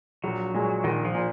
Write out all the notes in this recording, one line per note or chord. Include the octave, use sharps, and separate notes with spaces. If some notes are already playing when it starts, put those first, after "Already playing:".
A#1 F#3
A#2 G#3
A#1 D#3
F3
A#2